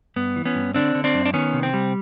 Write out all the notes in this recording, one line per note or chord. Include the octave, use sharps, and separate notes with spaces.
G2 B3
E3
B3 C#4
G2
D3 C4 D4
D3
C4 D4
F#2
D4
D#3 B3 C#4
C3
C4
G3